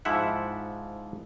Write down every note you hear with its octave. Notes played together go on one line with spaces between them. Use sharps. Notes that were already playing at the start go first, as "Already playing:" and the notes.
G#2 F3 E4 E5 F#5